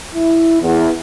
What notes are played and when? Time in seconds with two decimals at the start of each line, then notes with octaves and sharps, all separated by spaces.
0.14 E4
0.61 E2